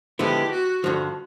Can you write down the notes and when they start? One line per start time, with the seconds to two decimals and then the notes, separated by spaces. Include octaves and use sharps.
0.19 D3 F3 G#3 B3 E4 G4
0.52 F#4
0.84 G2 D3 F3